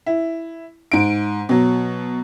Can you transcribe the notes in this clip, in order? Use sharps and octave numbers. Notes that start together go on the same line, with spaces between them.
E4
G#2 D7
B2 F#3